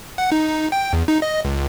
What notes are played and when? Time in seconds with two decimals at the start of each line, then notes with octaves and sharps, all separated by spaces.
0.18 F#5
0.32 D#4
0.72 G5
0.93 E2
1.08 D#4
1.22 D#5
1.45 C#2